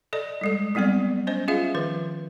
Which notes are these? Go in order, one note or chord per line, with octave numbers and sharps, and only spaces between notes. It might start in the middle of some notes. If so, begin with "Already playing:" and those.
A4 D5 D#5
G3 G#3 A4
F#3 G3 B3 C4 D5
C#4 C5 D#5
C#4 F4 G#4 E5 F5
D#3 F3 B4